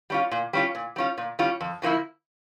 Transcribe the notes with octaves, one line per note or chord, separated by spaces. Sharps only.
G3 C#4 F4
A#2
G3 C#4 F4
A#2
G3 C#4 F4
A#2
G3 C#4 F4
F2
C#3 F3 A#3 E4